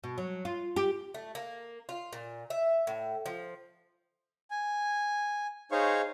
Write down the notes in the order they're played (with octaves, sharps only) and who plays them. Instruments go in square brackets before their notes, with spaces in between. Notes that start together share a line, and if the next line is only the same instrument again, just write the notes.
[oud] B2
F#3
F4
G4
[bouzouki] A3
A#3
F4
A#2
E5
A2
F3
[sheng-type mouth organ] G#5
D#4 G#4 C5 C#5 F5 C#6